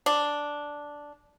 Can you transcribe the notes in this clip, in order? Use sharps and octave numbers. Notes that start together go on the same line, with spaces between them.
D4